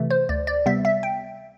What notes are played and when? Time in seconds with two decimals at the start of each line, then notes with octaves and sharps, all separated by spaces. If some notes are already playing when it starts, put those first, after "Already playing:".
Already playing: C3 E3 A3
0.11 C5
0.29 D2 D5
0.47 D5
0.66 C3 G3 B3 E5
0.85 E5
1.03 G5